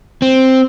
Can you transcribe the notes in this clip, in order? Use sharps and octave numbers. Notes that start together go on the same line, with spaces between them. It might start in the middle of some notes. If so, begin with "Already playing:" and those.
C4